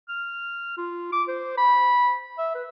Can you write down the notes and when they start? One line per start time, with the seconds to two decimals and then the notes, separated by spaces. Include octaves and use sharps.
0.08 F6
0.77 F4
1.12 D6
1.28 C5
1.57 B5
2.38 E5
2.55 B4